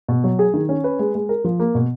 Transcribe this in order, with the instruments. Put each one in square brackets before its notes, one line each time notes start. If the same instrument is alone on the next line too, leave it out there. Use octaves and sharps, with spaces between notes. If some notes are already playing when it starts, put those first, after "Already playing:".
[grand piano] B2
F#3
G#4
D#3
C#4
B4
G#3
G#3
A#4
F3
A#3
B2